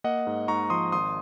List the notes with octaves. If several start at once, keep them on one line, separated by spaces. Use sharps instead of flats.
A#3 D#5 F#5
G#2
G#2 A#5 C#6
F3 C6 D#6
G#1 C6 D#6